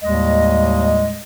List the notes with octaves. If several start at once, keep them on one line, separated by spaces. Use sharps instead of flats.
D#2 A2 G3 G#3 D#5